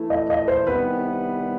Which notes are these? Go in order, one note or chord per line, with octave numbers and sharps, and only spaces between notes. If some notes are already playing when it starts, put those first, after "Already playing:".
Already playing: E3 A3 E4
D#5
D#5
C5
C2 C3 D#3 G3 B3 B4